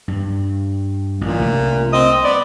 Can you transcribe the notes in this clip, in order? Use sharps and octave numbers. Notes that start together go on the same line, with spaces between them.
G2
A1 A#2
C2 A3
C4 D#5
B3 D5